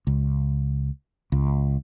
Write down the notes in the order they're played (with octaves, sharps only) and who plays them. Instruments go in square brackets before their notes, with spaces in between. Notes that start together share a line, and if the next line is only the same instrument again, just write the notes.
[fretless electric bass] C#2
C#2